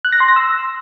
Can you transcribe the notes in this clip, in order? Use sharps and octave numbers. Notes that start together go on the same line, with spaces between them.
F#6
A#6
C6
A#6
E6